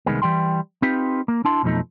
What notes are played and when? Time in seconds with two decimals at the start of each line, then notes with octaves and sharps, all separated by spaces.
0.06 C2 D#3 G#3 B3
0.22 E3 G3 G5 C6
0.82 C4 D#4 F4 G4 B4
1.28 A#3
1.45 D4 E4 A5 C6
1.63 B1 F2 B2 F3 A3 D#4